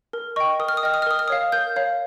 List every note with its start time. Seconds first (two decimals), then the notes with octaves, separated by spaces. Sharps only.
0.13 A#4
0.36 D#5 G5 C#6
0.60 A#4 D#6
0.69 F6
0.77 D#6
0.83 D#5 G5 F6
0.94 D#6
1.02 F6
1.06 A#4 D#6
1.19 F6
1.28 C#5 F5 D#6
1.52 A#4 G6
1.76 C#5 F5